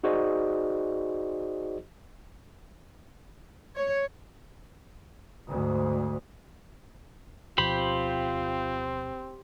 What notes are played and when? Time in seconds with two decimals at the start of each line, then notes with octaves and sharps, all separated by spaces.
0.04 D#4 F#4 G#4 C5 D5 D#5
3.76 C#5
5.47 D2 G#2
7.58 D2 B2 F3 C4 F4 G4 C5 B5